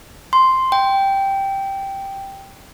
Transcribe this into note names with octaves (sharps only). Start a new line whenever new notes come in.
C6
G5